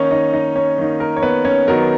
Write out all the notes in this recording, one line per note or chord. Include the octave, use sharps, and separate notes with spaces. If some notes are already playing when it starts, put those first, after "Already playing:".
Already playing: D#3 A#3 C#4 D#4 C#5
D#4 D#5
D#4 D#5
C#4 C#5
D#3 A#3 D#4
A#4
C#5
B3 B4
C#4 C#5
D#3 F#3 B3 D#4 A#4